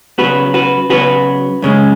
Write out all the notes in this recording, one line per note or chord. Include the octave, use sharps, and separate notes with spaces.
C#3 F#3 B3 F#4 B4
F#4 B4
C#3 F#3 B3 F#4 B4
F#2 C#3 G#3